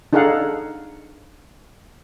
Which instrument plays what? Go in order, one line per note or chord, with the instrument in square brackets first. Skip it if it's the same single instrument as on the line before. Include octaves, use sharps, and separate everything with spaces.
[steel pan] D4 D#4 G#4 A4 F5 F#5